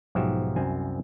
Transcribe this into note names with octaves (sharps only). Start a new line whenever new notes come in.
B1 G#2 F3 F#4 G4 E5
C2 F#2 C4 G#5